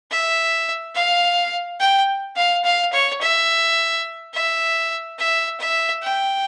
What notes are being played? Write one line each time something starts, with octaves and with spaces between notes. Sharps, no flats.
E5
F5
G5
F5
F5
C#5
E5
E5
E5
E5
G5